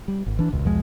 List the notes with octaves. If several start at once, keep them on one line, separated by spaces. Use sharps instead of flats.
G3
G#1
E3 D4
E1 C#2
B1 E2 F3 G#3